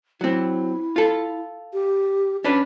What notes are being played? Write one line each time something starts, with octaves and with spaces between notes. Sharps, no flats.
F#3 C4 E4
F4 A4
G4
C#4 D4 B4 D5